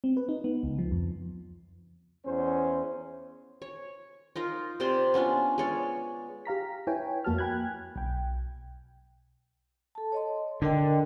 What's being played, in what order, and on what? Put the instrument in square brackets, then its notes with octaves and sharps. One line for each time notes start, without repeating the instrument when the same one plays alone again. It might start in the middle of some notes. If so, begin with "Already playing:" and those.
[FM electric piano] C4
B4
D#4
B3
C#2
F3
F2
[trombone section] E2 C#4 C5
[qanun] C#5
D#4 F4 A#4
C3 C5 D5 C6
B3 C#4 D4 F4
G#3 C#5 D5
[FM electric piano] G4 F5 A#5 B6
E4 B4 C#5 G5 G#5
F2 A#3 F#4 A5 F6
G5 G#5 B5 F#6 G#6
B1 G5
[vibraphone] A4 A5
C#5 D#5 C6
[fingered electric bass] D3 [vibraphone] A#4 D#5 G5